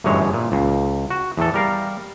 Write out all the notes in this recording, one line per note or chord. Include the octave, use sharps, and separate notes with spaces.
G1 F#2 A2 E3 G#3 C#5
A#2
C#2
F#4
E2 A2 A4
G3 A#4 F5